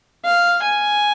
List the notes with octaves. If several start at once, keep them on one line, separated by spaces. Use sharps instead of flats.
F5
G#5